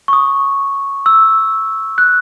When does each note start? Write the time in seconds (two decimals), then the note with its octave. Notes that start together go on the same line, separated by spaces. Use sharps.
0.08 C#6
0.13 D#6
1.06 E6
1.98 F#6